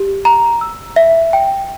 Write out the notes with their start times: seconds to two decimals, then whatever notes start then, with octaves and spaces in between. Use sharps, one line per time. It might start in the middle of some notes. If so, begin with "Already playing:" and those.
Already playing: G4
0.25 A#5
0.61 E6
0.96 E5
1.33 G5